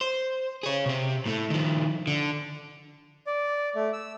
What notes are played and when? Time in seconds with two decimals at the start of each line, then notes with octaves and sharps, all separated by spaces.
0.01 C5
0.63 G#4 C#5
0.86 C3 C4
1.26 A2 A3
1.50 D#3 F3
2.07 D3
3.27 D5
3.75 A3
3.93 E6